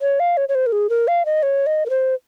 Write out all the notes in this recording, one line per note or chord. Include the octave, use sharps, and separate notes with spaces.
C#5
F5
C#5
C#5
C5
A#4
G#4
A#4
F5
D#5
C#5
D#5
A#4
C5